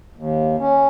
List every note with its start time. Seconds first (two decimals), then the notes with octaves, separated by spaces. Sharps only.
0.16 D#2
0.59 C#4